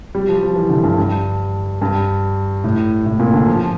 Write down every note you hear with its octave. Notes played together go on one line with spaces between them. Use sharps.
G3
F3
F3
E3
D3
G2
G2
G2
A2
A2
A#2
D3
F3